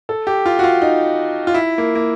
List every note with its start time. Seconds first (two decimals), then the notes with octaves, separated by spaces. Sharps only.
0.09 A4
0.27 G4
0.46 F4
0.59 F#4
0.64 F4
0.82 D#4
1.47 F4
1.54 E4
1.78 A#3
1.95 A#3